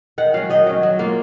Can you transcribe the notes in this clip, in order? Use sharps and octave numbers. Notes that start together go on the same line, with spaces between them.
D#3 F#5
F#3 C#4 F5
D#3 D#5
F#3 C#4
F#3
A#3 F4